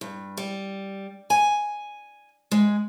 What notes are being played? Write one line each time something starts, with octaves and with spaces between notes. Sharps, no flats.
G2
G3
G#5
G#3